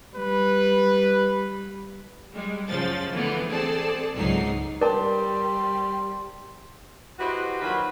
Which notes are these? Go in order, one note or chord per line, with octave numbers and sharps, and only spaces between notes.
G3 B4
G3 G#3
F#2 C#3 F3 A6
D3 E3 A3 B3
C4 G#4 A4 D5 A5
C#2 G#2 F#3 D#4 C7
G3 A#4 C5 D5 G5 A5
E4 F#4 G4 B4 C5 D#5
A#2 D#3 F#3 B4 C5 B5